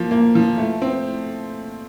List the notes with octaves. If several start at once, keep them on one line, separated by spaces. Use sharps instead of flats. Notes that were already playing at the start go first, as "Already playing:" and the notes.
Already playing: F3 A#3
A#3
F3
A3
C4